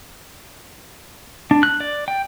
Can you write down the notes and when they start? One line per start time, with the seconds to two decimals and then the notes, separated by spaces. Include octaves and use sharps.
1.51 D4
1.63 F#6
1.80 D5
2.08 G5